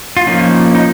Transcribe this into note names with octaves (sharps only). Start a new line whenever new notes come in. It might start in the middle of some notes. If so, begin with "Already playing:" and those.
F4
F3 A#3 C#4 D#4
D#4